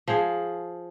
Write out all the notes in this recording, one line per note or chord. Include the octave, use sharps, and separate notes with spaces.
F3 G#4